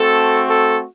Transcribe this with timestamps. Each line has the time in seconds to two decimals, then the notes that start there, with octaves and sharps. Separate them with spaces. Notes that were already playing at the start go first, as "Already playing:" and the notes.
Already playing: A3 C4 F#4 A4
0.48 A4